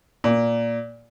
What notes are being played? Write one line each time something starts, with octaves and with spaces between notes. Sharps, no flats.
A#2